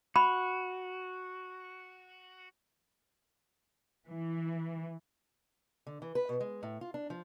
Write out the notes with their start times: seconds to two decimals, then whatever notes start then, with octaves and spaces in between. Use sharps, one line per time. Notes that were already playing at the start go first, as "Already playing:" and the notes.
0.16 F#4 B5
4.09 E3
5.87 D3
6.02 E3
6.15 B4
6.29 B2
6.40 G#3
6.63 A2
6.81 F4
6.94 D4
7.10 F3